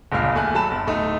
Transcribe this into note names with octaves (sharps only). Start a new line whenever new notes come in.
G1 C#2 A#2 F5 F6
D#2 A3 G#5 F#6
F#3 A4 A5 B5 E7
G1
D1 A3 D#4